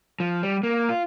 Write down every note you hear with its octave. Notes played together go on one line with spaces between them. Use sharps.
F3
G3
A#3
F4